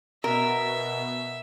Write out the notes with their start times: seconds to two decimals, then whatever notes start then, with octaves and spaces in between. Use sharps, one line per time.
0.24 B2 A#4 E5